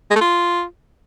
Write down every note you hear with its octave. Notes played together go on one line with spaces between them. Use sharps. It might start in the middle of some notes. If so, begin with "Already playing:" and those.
G#3
A3
F4